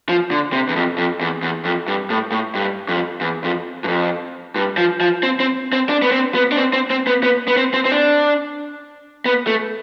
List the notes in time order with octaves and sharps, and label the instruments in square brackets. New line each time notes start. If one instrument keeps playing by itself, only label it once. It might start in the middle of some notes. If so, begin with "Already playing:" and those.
[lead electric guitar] F3
D3
C3
E2
F2
F2
E2
E2
F2
G2
A2
A2
G2
F2
E2
F2
G2
F2
G2
F3
F3
C4
C4
C4
D4
B3
C4
B3
D4
C4
C4
C4
B3
B3
B3
C4
C4
C4
D4
B3
A3